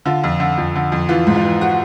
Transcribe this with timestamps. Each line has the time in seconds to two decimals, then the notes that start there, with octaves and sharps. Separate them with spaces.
0.06 D3 F4
0.24 F2
0.40 D3
0.58 F2
0.76 D3
0.92 F2
1.09 E3 F4
1.27 G#2
1.36 F4
1.44 E3
1.61 F#4